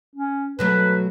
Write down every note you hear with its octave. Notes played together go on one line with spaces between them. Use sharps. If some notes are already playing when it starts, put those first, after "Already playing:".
C#4
B2 F#3 A3 B4